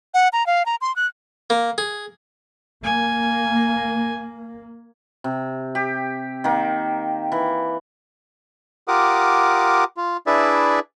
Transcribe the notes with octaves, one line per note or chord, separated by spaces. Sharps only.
F#5
A#5
F5
A#5
C6
F#6
A#3
G#4
A#3 G#5
C3
G4
D#3 A#3
E3
F4 G4 A#4 F#5 D6 D#6
F4
D4 E4 G#4 B4 D5 E5